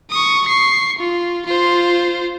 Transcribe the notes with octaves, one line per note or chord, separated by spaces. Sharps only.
C#6 D#6
C#6 C7
F4
F4 C5